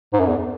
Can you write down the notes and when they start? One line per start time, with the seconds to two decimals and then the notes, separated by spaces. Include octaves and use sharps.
0.13 G#2
0.19 F#2
0.27 E2